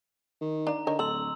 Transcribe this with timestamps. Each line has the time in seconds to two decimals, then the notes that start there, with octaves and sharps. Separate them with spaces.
0.41 D#3
0.67 D4 F5 A#5
0.87 D3 D#4 A#4 C#5
0.99 D1 A4 C6 E6 F#7